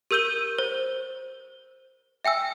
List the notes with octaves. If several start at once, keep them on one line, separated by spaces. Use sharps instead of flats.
G4 A#4 E6 G6 D#7 G7
C5
E5 G5 G#5 E6